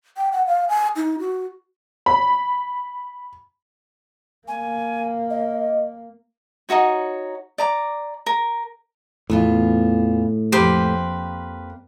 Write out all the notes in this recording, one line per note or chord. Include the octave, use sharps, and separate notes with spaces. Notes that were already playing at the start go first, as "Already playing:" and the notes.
G5
F#5
F5
G#5
D#4
F#4
B5
A#3 G#5
D#5
D#4 E4 F#4 C#5
D5 A#5 D6
A#4
E2 A2 E3 F4
F2 A#3 G4 B4 C5